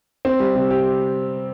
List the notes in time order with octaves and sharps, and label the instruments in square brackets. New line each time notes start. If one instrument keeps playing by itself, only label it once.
[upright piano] C4
G3
C3
G4